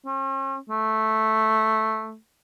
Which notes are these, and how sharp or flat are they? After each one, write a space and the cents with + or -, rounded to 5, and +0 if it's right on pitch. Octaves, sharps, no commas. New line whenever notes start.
C#4 -45
A3 -5